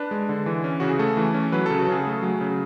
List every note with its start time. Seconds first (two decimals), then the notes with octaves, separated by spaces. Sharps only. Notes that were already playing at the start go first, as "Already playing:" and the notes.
Already playing: D4 B4
0.11 G#3
0.29 D3
0.46 E3
0.64 C#4
0.80 C#3 F#4
0.90 G#4
0.99 A3 A4
1.17 E3
1.34 C#4
1.52 F#3 B4
1.66 C#3 A4
1.79 F#4
1.85 A4
1.88 C#3 G#4
2.06 A3
2.23 F#3
2.41 C#3